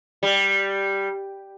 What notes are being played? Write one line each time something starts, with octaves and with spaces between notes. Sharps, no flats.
G3